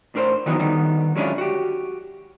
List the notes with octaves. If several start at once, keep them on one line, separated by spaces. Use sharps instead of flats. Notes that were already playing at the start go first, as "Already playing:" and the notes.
A2 D4 A#4 C5
D#3 E3 F#3 B3 D#4
D3 D#3 G3 B3 D#4
F#3 G#3 C#4 D4 E4 F4
F#4 G4